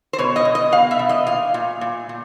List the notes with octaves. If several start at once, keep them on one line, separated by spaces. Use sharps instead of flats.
C5
B2 C#5
D#5
B2
D#5
B2 F5
E5
B2
D#5
A#2 F5
A#2
A#2
A#2